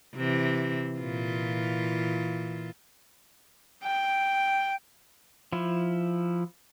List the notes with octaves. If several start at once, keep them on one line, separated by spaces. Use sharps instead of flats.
C3 E3 C4
A#2 E3 F4
G5
F3 E4